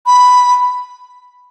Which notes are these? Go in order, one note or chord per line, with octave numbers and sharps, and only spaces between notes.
B5